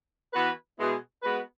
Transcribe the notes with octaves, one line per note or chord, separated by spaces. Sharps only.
E3 B3 F#4 B4
B2 G#3 B3 E4 G#4
G#3 B3 F#4 B4